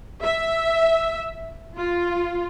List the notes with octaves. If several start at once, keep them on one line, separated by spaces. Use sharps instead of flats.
E5
F4